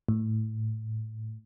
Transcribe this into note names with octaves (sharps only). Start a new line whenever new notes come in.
A2